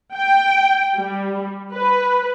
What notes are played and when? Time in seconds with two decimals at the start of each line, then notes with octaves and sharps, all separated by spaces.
0.14 G5
0.99 G3
1.72 B4